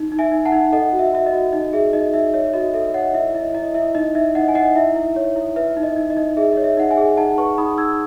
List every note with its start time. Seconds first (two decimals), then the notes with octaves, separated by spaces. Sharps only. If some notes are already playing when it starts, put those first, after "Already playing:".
Already playing: D#4
0.12 D#4
0.19 E5 G#5
0.32 D#4
0.45 F#5 A5
0.52 D#4
0.72 A4 D#5 F#5
0.93 F#4
0.99 E5
1.13 F#4 E5
1.26 D#5
1.33 F#4
1.53 D#4 D#5
1.73 G#4 E5
1.93 D#4 D#5
2.14 D#4 E5
2.34 C#5 E5
2.53 F#4 D#5
2.74 A4 E5
2.94 C#5 D#5 F#5
3.14 E4 E5
3.35 E4 D#5
3.54 E4 D#5
3.74 E4 E5
3.95 D#4 D#5
4.15 D#4 E5
4.35 D#4 D#5 F#5
4.48 G#5
4.55 D#4 D#5 F#5
4.75 E4 E5
4.96 E4
5.16 C#5
5.36 E4
5.56 B4 E5
5.77 D#4
5.83 D#5
5.96 D#4
6.10 D#5
6.17 D#4
6.37 G#4 E5
6.53 C#5 D#5
6.64 E5
6.77 D#4 F#5
6.91 E5 G#5
6.97 G#4
7.17 D#4 F#5 A5
7.38 B4 A5 C#6
7.58 D#4 B5 D#6
7.78 D#4 E6 G#6